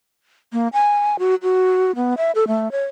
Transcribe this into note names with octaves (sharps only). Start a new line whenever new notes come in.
A#3
G#5
F#4
F#4
B3
E5
A4
A3
C#5